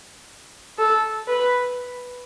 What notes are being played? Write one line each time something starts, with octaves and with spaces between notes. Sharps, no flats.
A4
B4